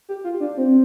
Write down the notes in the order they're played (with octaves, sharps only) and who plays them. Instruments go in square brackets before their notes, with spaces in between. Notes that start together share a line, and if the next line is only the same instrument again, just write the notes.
[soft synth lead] G4
F4
D4
C4